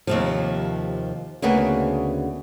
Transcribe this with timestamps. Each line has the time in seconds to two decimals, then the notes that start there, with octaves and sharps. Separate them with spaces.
0.07 D#2 C3 F3
1.42 D2 C#3 A#3 B3 G#4